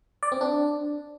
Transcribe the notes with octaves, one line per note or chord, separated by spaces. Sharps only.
D5
C4
D4